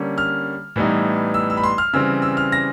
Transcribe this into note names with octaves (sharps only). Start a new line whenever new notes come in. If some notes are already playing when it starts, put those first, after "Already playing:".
Already playing: D3 G3 A#3 C#4
F6
A2 E3 G3 B3 D#4
E6
E6
B5
C6
F6
C#3 E3 G3 C4 E6
E6
F6
A#6